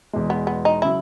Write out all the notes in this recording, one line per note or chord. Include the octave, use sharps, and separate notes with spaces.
E2 B2 G#3
B3
B3
D#4
C#3 F#3 E4